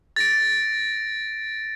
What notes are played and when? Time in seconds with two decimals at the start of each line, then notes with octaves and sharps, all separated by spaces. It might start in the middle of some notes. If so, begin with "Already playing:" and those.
0.16 A6 A#6 D7